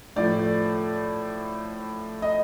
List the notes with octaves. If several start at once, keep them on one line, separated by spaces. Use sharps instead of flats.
A2 F3 A3 D5
D#5